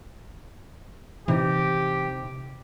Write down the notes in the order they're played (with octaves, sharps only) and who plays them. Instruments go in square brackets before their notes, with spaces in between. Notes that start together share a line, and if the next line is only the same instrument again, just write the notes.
[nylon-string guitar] C3 D#4 [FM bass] E3 [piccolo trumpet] G4